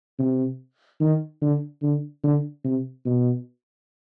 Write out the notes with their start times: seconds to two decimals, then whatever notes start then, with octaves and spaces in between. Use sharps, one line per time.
0.19 C3
1.01 D#3
1.42 D3
1.82 D3
2.24 D3
2.65 C3
3.05 B2